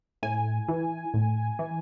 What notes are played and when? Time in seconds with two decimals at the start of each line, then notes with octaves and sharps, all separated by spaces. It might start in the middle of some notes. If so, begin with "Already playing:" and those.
0.23 A2 G#5
0.69 E3
1.14 A2
1.59 E3